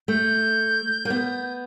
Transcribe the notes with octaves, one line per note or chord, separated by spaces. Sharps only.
A3 G6
A#3
B3